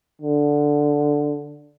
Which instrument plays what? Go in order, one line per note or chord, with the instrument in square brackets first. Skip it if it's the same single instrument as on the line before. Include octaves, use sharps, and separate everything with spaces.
[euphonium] D3